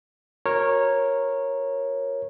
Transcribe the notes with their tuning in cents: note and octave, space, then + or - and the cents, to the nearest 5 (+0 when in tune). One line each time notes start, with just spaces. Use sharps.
F#4 +0 A#4 +0 C#5 -15